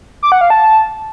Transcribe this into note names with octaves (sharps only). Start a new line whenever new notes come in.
D6
F#5
F5
A5